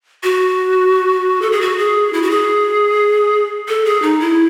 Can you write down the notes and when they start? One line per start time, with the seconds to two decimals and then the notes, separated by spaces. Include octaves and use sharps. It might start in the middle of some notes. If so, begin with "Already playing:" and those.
0.23 F#4
1.42 A4
1.52 G#4
1.61 F#4
1.78 G#4
2.13 E4
2.22 F#4
2.30 G#4
3.68 A4
3.85 G#4
4.02 D#4
4.20 E4